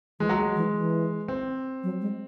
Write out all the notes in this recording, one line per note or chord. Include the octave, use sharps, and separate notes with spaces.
E3 G#3
F#3
G#3
E3
E3
C4
F#3
G#3